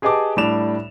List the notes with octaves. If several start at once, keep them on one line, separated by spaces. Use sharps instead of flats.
G4 G#4 B4 D#5 A5 D6
A2 G3 D4 D5 E7 F7